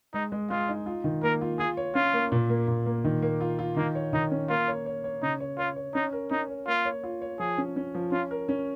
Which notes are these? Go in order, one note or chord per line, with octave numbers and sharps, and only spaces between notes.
G#3 D#4
G#3
G#3 F4
D#4
F4
D#3
A#3 A#4
F4
F4 G#4
C#5
C#4 F4
A#3
A#2
A#3
A#2
A#3
D#3
A#3
F4
F4
D#3 A#3
C#5
D#3 D#4
C#4
A#3 F4
C#5
C#5
C#5
C#3 D#4
C#5
F4 C#5
C#5
C#4 D#4
A#4
C#4 D#4
C#5
A#3 F4
C#5
F4
C#5
F3 G#4
C#4
C#4
F3
C#4 F4
A#4
C#4